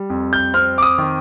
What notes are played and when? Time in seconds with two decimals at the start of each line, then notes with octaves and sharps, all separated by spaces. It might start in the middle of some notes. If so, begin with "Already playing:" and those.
Already playing: G3
0.10 F2
0.33 G6
0.54 C4 F6
0.78 D6
0.82 D#6
0.98 D#3